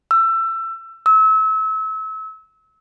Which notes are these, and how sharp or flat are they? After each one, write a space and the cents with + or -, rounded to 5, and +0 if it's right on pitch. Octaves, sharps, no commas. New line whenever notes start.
E6 +25
E6 -30